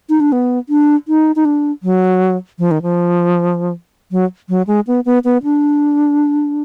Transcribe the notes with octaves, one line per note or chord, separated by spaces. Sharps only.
D#4
D4
B3
D4
D#4
D#4
D4
F#3
F3
D#3
F3
F#3
F#3
G#3
B3
B3
B3
D4